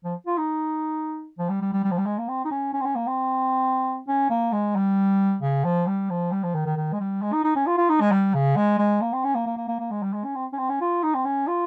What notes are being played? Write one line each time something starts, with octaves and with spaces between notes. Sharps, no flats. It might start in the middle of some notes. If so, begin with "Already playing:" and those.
F3
F4
D#4
F3
G3
G3
G3
G3
F3
G3
G#3
A#3
C4
D#4
C#4
C#4
C4
C#4
A#3
C4
C#4
A#3
G#3
G3
C#3
F3
G3
F3
G3
F3
D#3
D#3
D#3
G#3
G3
G#3
D#4
D#4
C#4
F4
F4
D#4
G#3
G3
C#3
G#3
G#3
A#3
C4
C#4
A#3
A#3
A#3
A#3
A#3
G#3
G3
G#3
C#4
C4
C#4
C4
C#4
F4
D#4
C4
C#4
F4